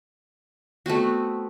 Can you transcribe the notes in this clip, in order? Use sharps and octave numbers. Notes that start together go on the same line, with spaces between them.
A3 B3 C4 F#4